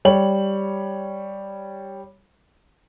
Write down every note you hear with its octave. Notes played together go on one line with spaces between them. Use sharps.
G3 C#5 F#7